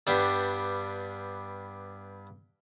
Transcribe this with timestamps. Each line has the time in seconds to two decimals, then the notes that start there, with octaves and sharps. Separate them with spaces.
0.07 G2 G3 B3 D4